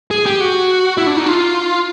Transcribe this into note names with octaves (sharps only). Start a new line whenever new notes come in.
G#4
G4
F#4
E4
D4
D#4
F4